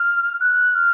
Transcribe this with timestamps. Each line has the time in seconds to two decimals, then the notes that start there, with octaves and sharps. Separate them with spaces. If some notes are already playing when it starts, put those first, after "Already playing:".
Already playing: F6
0.41 F#6
0.75 F6